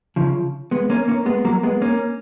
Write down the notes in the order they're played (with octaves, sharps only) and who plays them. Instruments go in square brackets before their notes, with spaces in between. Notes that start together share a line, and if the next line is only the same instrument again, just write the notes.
[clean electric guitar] C#3 F3
G#3 B3
A#3 C#4
A#3 C#4
G#3 B3
F#3 A#3
G#3 B3
A#3 C#4